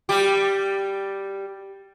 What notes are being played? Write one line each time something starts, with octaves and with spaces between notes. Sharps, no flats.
G3 G4